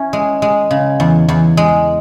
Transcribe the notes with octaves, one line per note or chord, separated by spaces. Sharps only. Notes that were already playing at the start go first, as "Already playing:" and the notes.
Already playing: C#4 E4
G#3
G#3
C#3
E2
E2
G#3